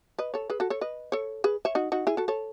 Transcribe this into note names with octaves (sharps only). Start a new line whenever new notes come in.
B4 D#5
A4 C#5
G#4 B4
F#4 A4
A4 C#5
B4 D#5
A4 C#5
G#4 B4
C#5 E5
D#4 F#4
D#4 F#4
E4 G#4
F#4 A4
A4 C#5